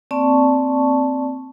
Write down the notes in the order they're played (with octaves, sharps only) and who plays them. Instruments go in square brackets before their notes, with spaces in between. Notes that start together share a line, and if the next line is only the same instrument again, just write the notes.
[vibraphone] A#3 C4 D5 A5 C#6